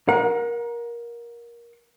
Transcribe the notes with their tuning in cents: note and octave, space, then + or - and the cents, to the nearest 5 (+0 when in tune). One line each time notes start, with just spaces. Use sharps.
A#4 +20 F#5 -35